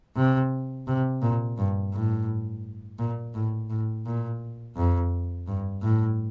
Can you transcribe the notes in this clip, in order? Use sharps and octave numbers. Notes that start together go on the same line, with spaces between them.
C3
C3
A#2
G2
A2
A#2
A2
A2
A#2
F2
G2
A2